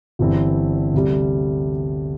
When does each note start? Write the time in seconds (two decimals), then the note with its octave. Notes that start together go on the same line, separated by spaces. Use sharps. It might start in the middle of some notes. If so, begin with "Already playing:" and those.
0.19 G1 G2 E3 C4 E4
0.94 D2 C3 G3